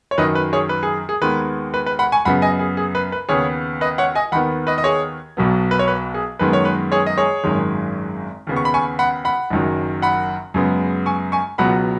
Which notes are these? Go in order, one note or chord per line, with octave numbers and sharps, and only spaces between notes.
C#5
F#2 D#3 F#3 B4 D#5
B4
G#4 C#5
B4
G#4
G#4
D#2 D#3 G#3 B3 B4
B4
B4
F#5 B5
G#5 C#6
F#2 C#3 B3 F#5 B5
D#5 G#5
G#4
G#4
B4
B4
D#2 C#3 B3 G#4 C#5
B4 D#5
C#5 F#5
D#5 G#5
D#2 D#3 B3 F#5 B5
B4 D#5
D#5
G#4 C#5
B1 B2 F#3 B3
B4
C#5
B4
G#4
F#2 D#3 G#3 B3 B4
C#5
B4
G#4 C#5
D#5
G#4 C#5
G#1 F#2 D#3 G#3
D#2 C#3 B3
C#6
B5
G#5 C#6
F#5 B5
F#5 B5
F#1 F#2 D#3 F#3
F#5 B5
F#2 C#3 G#3 B3
G#5 C#6
G#5 C#6
C#2 B2 F#3 B3 F#5 B5